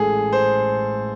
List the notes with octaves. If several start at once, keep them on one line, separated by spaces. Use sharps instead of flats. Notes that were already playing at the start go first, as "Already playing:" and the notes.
Already playing: A1 A2 G#3 G#4 A4
C5